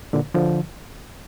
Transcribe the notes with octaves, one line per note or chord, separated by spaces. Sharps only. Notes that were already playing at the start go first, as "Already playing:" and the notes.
A#2 D3
D3 F3